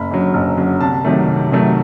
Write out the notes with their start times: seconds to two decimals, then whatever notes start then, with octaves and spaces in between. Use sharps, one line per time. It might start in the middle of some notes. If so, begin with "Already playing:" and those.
Already playing: F#1 B5
0.11 F#2 D3 F#3
0.34 F#1
0.57 F#2 D3 F#3
0.81 C2 A5
1.05 C3 D#3 F#3 A3
1.27 C2
1.51 C3 D#3 F#3 A3